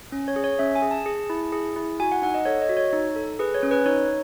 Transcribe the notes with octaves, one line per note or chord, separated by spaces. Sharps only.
C#4
C#5
G#4
C#5
C#4 E5
G#5
G#4
A5
G#4
E4
G#4
E4
F#4 G#5
F#5
D#4 F#5
D#5
A4 C#5
D#5
F#4
C#5
D#4
A4
G#4 B4
C#5
C#4
B4
D#4 C#5